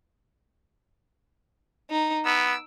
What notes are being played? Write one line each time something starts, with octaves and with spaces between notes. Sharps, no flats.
D#4
B3 E6 D7